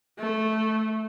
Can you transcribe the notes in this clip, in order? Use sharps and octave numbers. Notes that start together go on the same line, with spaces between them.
A3